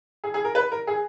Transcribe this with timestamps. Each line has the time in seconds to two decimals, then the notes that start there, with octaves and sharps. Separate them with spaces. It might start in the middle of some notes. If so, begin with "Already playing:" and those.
0.24 G#4
0.34 G#4
0.45 A#4
0.55 B4
0.72 A#4
0.87 G#4